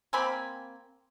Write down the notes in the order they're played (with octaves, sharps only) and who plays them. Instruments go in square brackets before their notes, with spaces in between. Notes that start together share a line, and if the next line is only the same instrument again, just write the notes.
[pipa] A#3 C4 G#5 B5